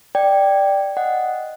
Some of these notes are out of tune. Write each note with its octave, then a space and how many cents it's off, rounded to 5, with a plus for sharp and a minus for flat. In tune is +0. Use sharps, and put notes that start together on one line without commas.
D5 +5 G5 +0
D#5 +0 F#5 +0